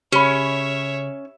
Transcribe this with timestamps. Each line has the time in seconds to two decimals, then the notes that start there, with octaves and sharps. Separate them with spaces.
0.12 C#3 C#4 G4 C#5 E5 B5